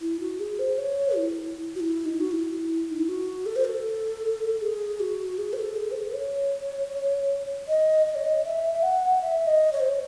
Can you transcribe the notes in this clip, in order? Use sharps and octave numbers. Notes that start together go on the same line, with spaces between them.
E4
F#4
G#4
C5
C#5
E4
F#4
E4
D#4
F#4
E4
D#4
E4
F#4
A4
C5
A4
G#4
F#4
G#4
C5
A4
G#4
C5
A4
C#5
D#5
D#5
C#5
D#5
E5
E5
F#5
E5
D#5
C#5
C5
C#5